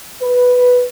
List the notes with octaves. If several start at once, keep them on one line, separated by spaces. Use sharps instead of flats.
B4